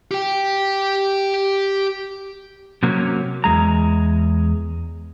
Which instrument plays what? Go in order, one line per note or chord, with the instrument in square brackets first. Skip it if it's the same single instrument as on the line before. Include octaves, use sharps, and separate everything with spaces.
[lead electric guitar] G4 G5
[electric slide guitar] C3 F#3 A#3 C#4
E2 G#3 A#5